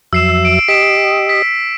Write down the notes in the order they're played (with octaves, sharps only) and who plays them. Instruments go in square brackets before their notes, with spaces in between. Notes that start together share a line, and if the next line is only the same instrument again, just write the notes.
[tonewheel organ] F2 F#3 E5 [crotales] E6 C7 E7
[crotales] D7
[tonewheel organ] G4 D#5 [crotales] B6 D7 E7
[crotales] B6